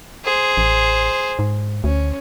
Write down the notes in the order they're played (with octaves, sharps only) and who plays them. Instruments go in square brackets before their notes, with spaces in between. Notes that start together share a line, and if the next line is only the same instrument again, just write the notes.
[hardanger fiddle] G#4 C5
[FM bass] A1
G#2
[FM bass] D2 [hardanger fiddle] C#4